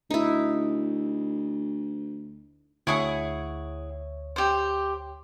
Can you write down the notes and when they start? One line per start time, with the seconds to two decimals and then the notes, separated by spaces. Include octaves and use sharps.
0.11 D2 D#4 E4
2.87 D2 E4 G#4 C#5 E5 F#5
4.36 G4 C5